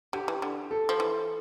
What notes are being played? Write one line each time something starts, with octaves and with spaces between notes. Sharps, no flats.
D3 G4
E3
D3
A4
F3
E3